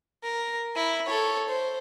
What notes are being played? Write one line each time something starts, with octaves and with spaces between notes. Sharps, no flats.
A#4
E4
A4 C#5
C5